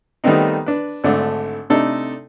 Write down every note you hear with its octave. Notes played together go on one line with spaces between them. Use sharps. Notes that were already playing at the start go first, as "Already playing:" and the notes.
D#3 G3 A3 B3 C4 D#4
D4 B4
G#1 D3 A3 D4
C3 A3 D4 D#4 A4